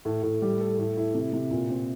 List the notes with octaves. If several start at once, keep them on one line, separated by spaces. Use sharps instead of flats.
A2
A2
G3
A4
A2
E4
C3
C3
A#2
C4